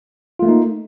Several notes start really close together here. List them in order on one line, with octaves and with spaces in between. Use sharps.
F4 A3 A#3 D#4